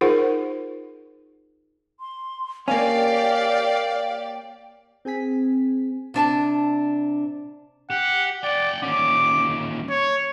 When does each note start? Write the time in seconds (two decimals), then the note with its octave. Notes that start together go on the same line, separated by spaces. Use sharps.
0.01 D#4 F4 G#4 A#4 C5 F#5
2.00 C6
2.68 A#3 C#4 G4 D5 F5 G5
5.05 C4 G#4 G#5 B6
6.14 C3 D4 G#5 A5
7.90 G4 F#5
8.43 D5 F#5 G5
8.83 D#2 C#4 D6
9.90 C#5